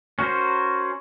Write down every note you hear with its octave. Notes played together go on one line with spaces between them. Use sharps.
C#4 F#4 A#4 C5